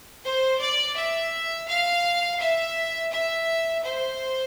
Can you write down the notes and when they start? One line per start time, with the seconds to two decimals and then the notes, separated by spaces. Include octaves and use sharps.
0.24 C5
0.60 D5
0.95 E5
1.68 F5
2.39 E5
3.11 E5
3.83 C5